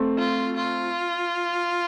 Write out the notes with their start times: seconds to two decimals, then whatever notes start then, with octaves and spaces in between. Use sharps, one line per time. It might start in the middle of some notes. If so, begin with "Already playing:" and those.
Already playing: A3 C4
0.18 F4
0.57 F4